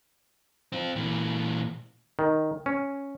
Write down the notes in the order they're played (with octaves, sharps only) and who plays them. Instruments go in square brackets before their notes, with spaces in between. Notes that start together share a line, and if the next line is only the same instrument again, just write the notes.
[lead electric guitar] C4 F4
A#2 E3
[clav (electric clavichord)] D#3
C#4